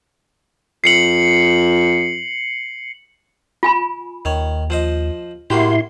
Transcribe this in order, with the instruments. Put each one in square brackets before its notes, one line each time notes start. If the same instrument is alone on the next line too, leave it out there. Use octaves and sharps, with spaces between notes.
[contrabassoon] F2 [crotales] C7 C#7 F#7
[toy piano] F4 G#5 B5
[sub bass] D#2 [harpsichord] D#3 C#5
[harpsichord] F3 C5 D#5
[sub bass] A2 [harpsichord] A#3 F#4 G4 [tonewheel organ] E4 C6